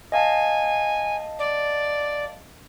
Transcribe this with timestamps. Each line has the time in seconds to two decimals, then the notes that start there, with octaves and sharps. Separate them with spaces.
0.12 D#5 F5 G#5 A5
1.39 D5